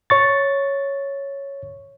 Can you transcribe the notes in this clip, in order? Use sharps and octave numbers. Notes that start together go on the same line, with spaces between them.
C#5 C#6 A6